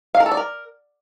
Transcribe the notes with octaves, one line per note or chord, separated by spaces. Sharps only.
F5
A#4
A4
D5
A#4